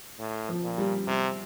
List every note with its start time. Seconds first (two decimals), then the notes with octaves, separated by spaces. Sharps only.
0.19 A2
0.49 F3
0.63 A#2
0.78 G3
1.07 C3 G3